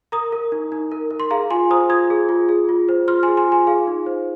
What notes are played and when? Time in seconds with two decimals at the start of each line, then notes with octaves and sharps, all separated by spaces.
0.12 A#4 A#5 D#6
0.32 A#4
0.52 D#4
0.72 D#4
0.92 A#4
1.11 A#4
1.20 C6
1.30 G#4 F5 A#5
1.50 F4 G#5 C6
1.71 C5 A#5 D#6
1.89 F4 D#6 G#6
2.10 G#4
2.29 F4
2.49 G#4
2.69 F4
2.89 C5
3.08 F4 C6 F6
3.23 G#5 C6
3.28 G#4
3.37 G#5 C6
3.47 F4 G#5 C6
3.67 G#4 F5
3.87 D#4
4.06 C5